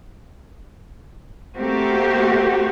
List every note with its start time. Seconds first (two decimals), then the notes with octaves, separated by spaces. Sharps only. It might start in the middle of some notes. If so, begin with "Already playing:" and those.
1.57 A3 A#3 C4 F#4 G4